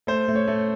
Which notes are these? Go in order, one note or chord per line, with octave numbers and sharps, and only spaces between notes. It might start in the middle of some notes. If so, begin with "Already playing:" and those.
A3 C5
A3
C#5
A3